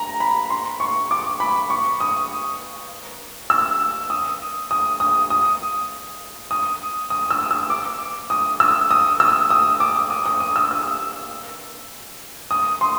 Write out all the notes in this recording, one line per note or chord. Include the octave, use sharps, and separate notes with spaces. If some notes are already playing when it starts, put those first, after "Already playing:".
Already playing: A#5
B5
C6
C#6
D6
B5
C#6
D#6
E6
D#6
D#6
D#6
D#6
D#6
D#6
E6
E6
D6
D#6
E6
D#6
E6
D#6
D6
D#6
D#6
D#6
E6
E6
D#6
C6